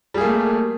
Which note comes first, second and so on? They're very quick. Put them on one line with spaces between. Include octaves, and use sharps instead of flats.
G3 G#4 A#3 A3